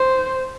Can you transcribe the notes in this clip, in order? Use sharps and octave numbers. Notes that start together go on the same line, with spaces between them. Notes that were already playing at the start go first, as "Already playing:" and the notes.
Already playing: C5